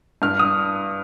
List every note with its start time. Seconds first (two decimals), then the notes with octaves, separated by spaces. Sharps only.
0.22 G2 F6
0.39 D#6